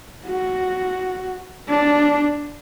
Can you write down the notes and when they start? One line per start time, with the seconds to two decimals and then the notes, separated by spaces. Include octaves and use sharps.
0.26 F#4
1.69 D4